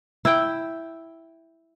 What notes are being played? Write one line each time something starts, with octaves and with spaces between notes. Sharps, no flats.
E4 G5